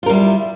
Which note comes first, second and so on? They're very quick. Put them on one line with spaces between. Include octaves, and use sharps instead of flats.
F4 A#4 G3 E4